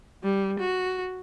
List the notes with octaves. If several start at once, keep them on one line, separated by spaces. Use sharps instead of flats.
G3
F#4